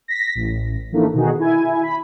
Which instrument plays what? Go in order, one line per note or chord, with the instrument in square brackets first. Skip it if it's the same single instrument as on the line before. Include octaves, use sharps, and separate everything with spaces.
[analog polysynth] A#6 B6
A1
E3 F3 A3 A#3 D4 D#4
B2 D3 D#3 D#4 F#4 G#4
E4 G#5
B5